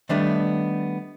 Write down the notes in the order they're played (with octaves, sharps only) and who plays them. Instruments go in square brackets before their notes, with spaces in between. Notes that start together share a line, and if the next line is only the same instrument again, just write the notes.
[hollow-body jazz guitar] D#3 G3 A3 B3 D4